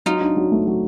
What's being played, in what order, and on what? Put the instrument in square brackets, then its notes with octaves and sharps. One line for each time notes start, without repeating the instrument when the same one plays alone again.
[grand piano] F#3 [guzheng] D#4 F4
[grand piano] D4
F#3
A3
F#3